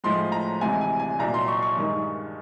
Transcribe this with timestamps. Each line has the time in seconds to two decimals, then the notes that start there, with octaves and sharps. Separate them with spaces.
0.04 A2 F3 G#3 C6
0.32 A#5
0.61 D2 C3 E3 G#3 G#5
0.81 G#5
1.00 G#5
1.19 C2 A#2 F#3 A#5
1.34 C6
1.48 C#6
1.62 C#6
1.76 G2 D#3 G#3